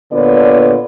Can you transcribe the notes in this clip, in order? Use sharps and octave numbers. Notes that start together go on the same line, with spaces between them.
A#2 D3 B3 C#5 D5